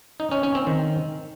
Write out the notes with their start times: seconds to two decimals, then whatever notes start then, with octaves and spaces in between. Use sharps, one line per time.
0.20 D#4
0.31 C#4
0.43 C#4
0.55 C4
0.67 D#3